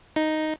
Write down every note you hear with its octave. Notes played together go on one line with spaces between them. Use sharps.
D#4